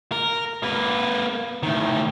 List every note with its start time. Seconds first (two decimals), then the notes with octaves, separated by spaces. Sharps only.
0.12 A#4
0.63 A#3 B4
1.63 A2 D#3